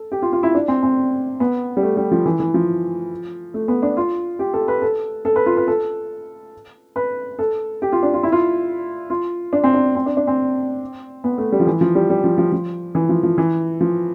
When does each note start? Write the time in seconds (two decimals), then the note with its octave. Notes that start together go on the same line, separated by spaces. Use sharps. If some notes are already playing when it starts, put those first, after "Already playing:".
Already playing: A4
0.12 G4
0.22 F4
0.33 F4
0.43 E4
0.55 D4
0.68 C4
0.83 C4
1.40 B3
1.77 G3
1.83 A3
1.97 G3
2.11 F3
2.26 E3
2.40 E3
2.54 F3
3.54 A3
3.68 B3
3.83 D4
3.97 F4
4.39 G4
4.53 A4
4.68 B4
4.82 A4
5.25 A4
5.36 B4
5.46 F4
5.57 B4
5.68 A4
6.96 B4
7.39 A4
7.82 G4
7.92 F4
8.03 D4
8.14 F4
8.23 E4
8.32 F4
9.10 F4
9.53 D4
9.64 C4
9.74 D4
9.95 C4
10.06 D4
10.17 D4
10.27 C4
11.24 B3
11.38 A3
11.52 G3
11.60 F3
11.67 E3
11.81 F3
11.95 G3
12.10 G3
12.24 F3
12.38 F3
12.52 F3
12.95 E3
13.09 F3
13.23 F3
13.38 E3
13.81 F3